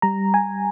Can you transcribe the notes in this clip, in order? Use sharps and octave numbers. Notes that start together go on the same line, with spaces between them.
G3 A#5
G#5